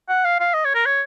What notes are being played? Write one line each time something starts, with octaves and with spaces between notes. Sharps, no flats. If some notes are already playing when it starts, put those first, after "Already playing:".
F#5
F5
F5
D#5
C#5
A#4
C#5